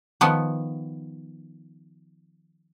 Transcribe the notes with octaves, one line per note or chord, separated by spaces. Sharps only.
D#3 F3 B3